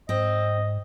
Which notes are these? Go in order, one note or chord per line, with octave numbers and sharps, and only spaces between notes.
G#2 C4 D#5